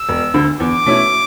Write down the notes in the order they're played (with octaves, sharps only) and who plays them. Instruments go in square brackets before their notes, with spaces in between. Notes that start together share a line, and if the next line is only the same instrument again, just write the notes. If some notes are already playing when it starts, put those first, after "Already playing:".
Already playing: [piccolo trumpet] E6
[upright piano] E1
D2 D3
[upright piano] E2 [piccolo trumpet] D6
[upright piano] B2 A3 C#4 E4